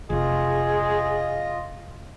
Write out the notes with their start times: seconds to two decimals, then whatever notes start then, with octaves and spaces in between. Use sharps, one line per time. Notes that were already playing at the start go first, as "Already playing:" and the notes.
0.10 F1 C3 F4 G#4 D#5